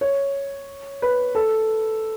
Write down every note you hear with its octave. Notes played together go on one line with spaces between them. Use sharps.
C#5
B4
A4